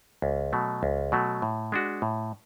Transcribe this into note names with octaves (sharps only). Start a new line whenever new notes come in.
C#2
B2 F#3 A3
C#2
B2 F#3 A3
A2
G#3 D4 F#4
A2